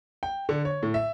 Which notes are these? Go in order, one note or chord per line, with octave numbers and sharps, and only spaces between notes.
G5
D3
C#5
A2
E5